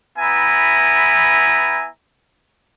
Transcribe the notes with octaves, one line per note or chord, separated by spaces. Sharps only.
B3 E4 E5 G#5 A#5